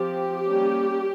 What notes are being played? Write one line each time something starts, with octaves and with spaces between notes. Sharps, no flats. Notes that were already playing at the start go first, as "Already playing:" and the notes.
Already playing: F3 C4 G4
G3 A#3 C#4